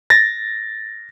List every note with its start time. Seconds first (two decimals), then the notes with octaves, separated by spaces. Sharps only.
0.10 A6 A#6